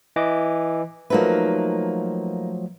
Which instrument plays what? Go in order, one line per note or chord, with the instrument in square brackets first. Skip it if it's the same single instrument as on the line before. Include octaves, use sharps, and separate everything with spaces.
[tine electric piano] E3 D#5 D6
[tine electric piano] F3 F#3 A3 [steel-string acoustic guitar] A#3 D#4 B4